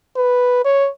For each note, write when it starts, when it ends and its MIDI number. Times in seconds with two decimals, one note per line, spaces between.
0.16 0.63 71
0.65 0.88 73